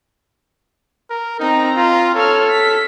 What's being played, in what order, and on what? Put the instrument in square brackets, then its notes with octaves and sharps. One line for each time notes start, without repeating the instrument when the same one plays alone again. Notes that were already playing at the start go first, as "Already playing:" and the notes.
[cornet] A#4
[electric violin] C4 A#5 [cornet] D#4
[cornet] F4
[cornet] A4 [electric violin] C#5 F6
[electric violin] B6